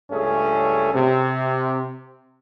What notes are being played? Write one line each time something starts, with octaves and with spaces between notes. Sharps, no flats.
C#2 G2 A3 C#4 G#4
C3